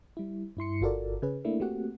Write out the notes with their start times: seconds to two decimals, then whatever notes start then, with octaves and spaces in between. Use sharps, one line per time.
0.17 G3 E4
0.57 G2 E4 C6 C#7
0.81 G1 F4 F#4 A4 A#4 D5
1.22 C#3 C#4 G#4 B4
1.45 A3 A#3 D4 E4
1.60 A3 A#3 C4 F#4 G4 F#5